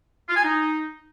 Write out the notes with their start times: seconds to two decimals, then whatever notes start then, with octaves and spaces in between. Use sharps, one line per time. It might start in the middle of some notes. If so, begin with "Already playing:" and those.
0.29 F4
0.37 G#5
0.44 D#4